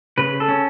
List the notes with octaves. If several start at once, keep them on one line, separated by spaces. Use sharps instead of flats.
C#3 B4
A4
C#4